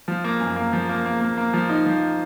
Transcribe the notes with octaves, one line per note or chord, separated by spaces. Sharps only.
F3
A#3
F#2
A#3
F3
A#3
A#3
A#3
A#3
F3
D#4
F3